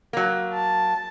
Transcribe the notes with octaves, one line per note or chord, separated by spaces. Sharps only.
F#3 A#3
A5